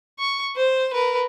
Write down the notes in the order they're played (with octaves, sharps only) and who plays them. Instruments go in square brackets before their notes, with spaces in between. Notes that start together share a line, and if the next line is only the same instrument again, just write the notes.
[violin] C#6
C5
A#4 B4